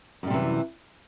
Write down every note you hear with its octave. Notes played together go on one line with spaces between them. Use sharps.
F#2 C3 E3 G3